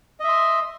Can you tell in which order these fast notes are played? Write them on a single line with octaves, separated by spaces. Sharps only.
D#5 E5 C6